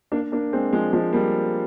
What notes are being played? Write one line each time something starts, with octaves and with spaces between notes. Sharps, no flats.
A#3 D4
A#3 D4
G#3 C4
F3 G#3
F3 G#3
G3 A#3